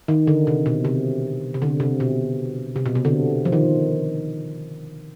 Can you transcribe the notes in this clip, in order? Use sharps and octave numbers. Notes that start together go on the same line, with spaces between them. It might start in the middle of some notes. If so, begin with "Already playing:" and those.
D#3
D3
C3
B2
C3
C3
D3
C3
B2
C3
B2
C3
D3
F3
D#3